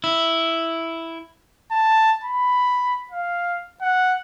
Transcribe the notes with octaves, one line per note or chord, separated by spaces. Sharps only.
E4
A5
B5
F5
F#5